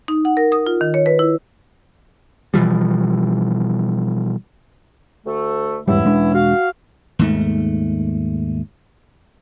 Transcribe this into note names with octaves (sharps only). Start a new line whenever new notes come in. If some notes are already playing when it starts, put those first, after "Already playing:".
D#4
F#5
A#4
D#6
F4
D#3
C#5
B4
E4
B2 E3 F3 G3
D2 A3
E2 G#2 G3 B3 C#4 E4
E1 G#3 D4
F#4 F5
D#2 G#2 A3